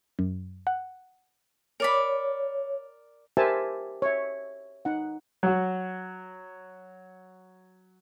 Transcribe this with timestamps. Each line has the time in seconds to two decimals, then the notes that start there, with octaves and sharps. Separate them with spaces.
0.19 F#2
0.67 F#5
1.80 A#4 C#5 D5 B5
3.37 G4 A#4 C5 E5 G#5 A5
4.02 C#5 E5
4.85 D#4 F#5
5.43 F#3 F#4